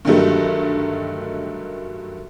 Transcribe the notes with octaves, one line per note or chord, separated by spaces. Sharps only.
G2 D3 D#3 F#3 G3 A3